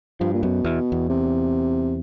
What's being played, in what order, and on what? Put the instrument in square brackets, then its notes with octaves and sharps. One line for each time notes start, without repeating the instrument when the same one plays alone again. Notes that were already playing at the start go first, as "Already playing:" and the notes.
[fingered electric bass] G2 [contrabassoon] F3
[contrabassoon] A#2
[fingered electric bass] F#2 [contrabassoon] B2
[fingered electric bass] E2
E2
[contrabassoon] C3